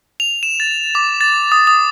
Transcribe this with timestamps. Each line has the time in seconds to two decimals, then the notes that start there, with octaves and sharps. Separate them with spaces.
0.20 F7
0.43 E7
0.60 A6
0.95 D6
1.21 A6
1.52 D#6
1.67 D#6